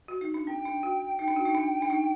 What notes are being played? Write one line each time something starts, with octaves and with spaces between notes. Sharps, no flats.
F#4
D#4
D4
C4 G5
D4
F#4
D#4 G5
D4
F#4
D#4
D4
D4
D#4